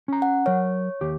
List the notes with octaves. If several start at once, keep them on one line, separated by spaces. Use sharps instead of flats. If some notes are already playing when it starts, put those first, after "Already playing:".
C#4 A#5
F#5
F#3 A#4 C#5
D#2 G4